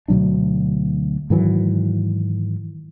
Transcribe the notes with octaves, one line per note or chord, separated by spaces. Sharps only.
D2 B2 F#3 D4
G#2 D#3 E3 F#3